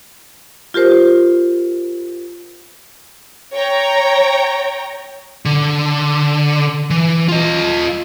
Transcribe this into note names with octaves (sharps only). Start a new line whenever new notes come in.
F4 G4 A#4 C5
C#5 G5 A#5
D3
E3
F4 D#5